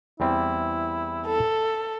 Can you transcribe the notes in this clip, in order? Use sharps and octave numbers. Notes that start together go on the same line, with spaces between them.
E2 G3 C4 E4
A4